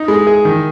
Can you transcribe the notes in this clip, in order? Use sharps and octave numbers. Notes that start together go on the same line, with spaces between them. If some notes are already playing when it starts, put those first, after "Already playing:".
Already playing: D#4
G#3
G#4
D#3